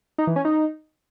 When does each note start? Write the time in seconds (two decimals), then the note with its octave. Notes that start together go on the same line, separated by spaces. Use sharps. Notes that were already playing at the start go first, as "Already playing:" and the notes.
0.18 D#4
0.27 E3
0.36 C#4
0.45 D#4